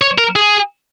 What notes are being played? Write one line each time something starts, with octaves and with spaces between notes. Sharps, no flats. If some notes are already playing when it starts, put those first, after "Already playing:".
C#5
A#4
G#4